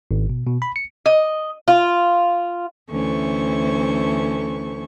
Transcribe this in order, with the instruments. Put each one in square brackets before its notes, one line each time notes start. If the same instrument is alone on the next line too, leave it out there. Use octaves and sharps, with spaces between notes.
[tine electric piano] G#1
B2
B2
B5
C#7
[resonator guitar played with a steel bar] D#5
[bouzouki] F4
[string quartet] D2 E3 C#4 A4 C5 C#6